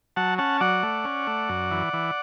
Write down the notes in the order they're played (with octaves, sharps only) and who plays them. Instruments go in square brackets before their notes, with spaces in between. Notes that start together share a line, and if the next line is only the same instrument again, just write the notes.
[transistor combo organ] F#3 F#5 A5
C#4 F#5 A5
F#3 D5 F#5
A3
C#4
A3
F#2
E3
E3